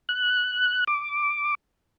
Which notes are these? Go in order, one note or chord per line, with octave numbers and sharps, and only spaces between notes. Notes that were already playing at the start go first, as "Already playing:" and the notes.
F#6
D6